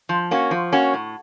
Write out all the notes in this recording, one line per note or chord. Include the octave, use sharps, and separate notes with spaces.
F3
A#3 C#4 F#4
F3
A#3 C#4 F#4
A2